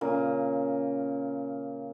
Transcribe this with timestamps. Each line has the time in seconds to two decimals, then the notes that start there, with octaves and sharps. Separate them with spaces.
0.01 A#2 C#3 A#4